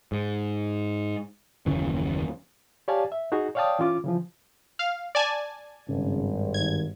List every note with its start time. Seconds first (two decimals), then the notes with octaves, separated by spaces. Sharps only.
0.12 G#2
1.66 F#1 D#2 C#3 E3
2.88 G4 C#5 D5 F5 G#5 A5
3.12 E5
3.32 D#4 F#4 G#4
3.55 C#5 D5 F5 G5 A5 D#6
3.79 E3 C#4 F4 D6
4.04 C#3 E3 F3
4.79 F5
5.15 D5 G#5 A5
5.89 G#1 G2 C#3
6.54 D#3 G#6